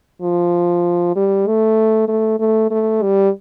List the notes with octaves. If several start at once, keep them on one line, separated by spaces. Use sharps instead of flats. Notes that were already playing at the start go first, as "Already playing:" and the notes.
F3
G3
A3
A3
A3
A3
G3